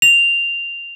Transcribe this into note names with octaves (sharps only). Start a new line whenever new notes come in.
F7